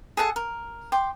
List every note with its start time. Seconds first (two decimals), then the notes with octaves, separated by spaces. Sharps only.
0.17 G#4 A4 F#5 A5
0.36 A#4
0.92 G5 C6 D6